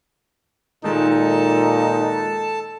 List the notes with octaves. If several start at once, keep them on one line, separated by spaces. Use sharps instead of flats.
A#2 D#3 G#3 D#4 A4 A5